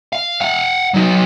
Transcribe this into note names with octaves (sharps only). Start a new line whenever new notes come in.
F5
F5 F#5
F#3 D#4